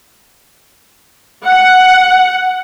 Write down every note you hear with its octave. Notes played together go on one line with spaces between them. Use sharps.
F#5